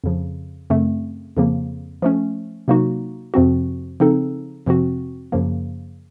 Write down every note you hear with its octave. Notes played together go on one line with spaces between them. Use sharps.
F2 C#3 F3
F#2 C#3 A3 C4
F2 C#3 F3 A#3
F3 A3 C#4
C3 F#3 A#3 D#4 F#4
F2 C3 F3 C4 F#4
C#3 F3 C4 D#4 A4
F2 C3 F3 C4 F#4
F#2 C#3 F3 A#3